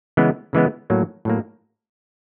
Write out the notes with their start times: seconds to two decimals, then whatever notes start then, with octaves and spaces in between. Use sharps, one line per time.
0.17 C#3 E3 G#3 B3
0.53 C#3 E3 G#3 B3
0.90 A2 F#3 A#3
1.25 A2 F#3 A#3